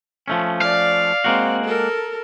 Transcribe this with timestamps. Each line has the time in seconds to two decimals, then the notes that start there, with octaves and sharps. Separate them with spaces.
0.28 F3 A3 C#4
0.61 D5 F5
1.24 G#3 A#3 C4 F#4
1.65 A4 A#4